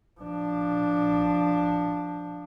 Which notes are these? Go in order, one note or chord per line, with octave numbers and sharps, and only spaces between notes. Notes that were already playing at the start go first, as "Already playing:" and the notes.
F3 D4